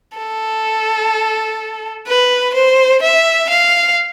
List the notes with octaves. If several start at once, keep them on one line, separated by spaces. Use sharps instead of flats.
A4
B4
C5
E5
F5